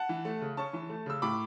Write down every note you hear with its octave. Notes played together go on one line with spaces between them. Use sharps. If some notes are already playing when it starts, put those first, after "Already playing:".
Already playing: F#5 A5
E3
A3
C#3
C#4 A5 C#6
E3
A3
C#3 E6
A2 B5 D6